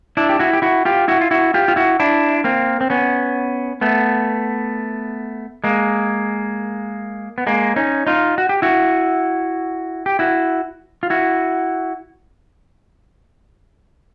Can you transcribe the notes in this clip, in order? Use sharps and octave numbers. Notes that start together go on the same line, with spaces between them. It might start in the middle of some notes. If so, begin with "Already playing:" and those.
D4 E4
G4
E4 F#4
G4
E4 F#4
F4 G4
E4 F#4
F4
E4 F#4
F4 G4
F4
E4 F#4
D4 E4
A#3 C4
C4
B3 C#4
A3 B3
G#3 A#3
B3
G#3 A#3
C#4 D#4
D#4 F4
F#4
G4
E4 F#4
G4
E4 F#4
F4
E4 F#4